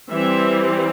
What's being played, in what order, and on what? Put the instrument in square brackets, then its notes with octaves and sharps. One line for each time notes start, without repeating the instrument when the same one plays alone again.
[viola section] E3 G3 C4 E5